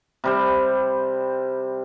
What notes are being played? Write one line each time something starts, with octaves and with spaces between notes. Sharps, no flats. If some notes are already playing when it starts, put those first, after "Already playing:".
C3 G3 C5